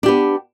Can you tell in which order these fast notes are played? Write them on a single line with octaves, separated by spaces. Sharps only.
D4 G4 B3